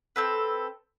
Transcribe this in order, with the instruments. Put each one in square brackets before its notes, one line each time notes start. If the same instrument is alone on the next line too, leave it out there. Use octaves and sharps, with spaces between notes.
[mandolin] C4 A4 B4